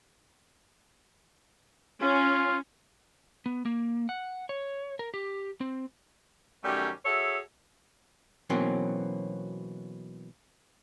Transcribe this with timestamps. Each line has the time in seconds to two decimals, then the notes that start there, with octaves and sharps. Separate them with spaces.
2.02 C#4 F4
3.46 B3
3.65 A#3
4.09 F#5
4.49 C#5
4.99 A#4
5.14 G4
5.61 C4
6.64 F#2 D#3 G3 A3 C#4 G4
7.06 F#4 G#4 A4 C#5 E5
8.50 B2 E3 F#3 A#3 C4 C#4